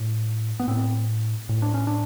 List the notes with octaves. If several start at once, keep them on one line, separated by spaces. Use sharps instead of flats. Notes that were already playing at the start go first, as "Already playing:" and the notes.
Already playing: A2
B3
A2 C4
A2
D4
C#4
D4